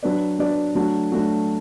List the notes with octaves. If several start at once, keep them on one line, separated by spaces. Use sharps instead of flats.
F#3 D4 B4 D5
F#3 D4 B4 D5
F#3 A3 D4 F#4
F#3 A3 D4 F#4